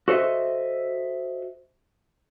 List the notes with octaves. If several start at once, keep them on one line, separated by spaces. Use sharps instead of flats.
F#4 A4 C5 D#5 E5